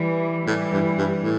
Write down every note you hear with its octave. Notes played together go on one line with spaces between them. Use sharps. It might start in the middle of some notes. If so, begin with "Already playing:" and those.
Already playing: E3 G3
A2 E3 G3
G2
G2
A2